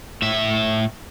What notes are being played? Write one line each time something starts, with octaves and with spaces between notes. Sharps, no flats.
A2 E5